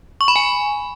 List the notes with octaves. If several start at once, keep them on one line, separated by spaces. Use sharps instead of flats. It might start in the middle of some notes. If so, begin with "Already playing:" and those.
C#6
B5
G#5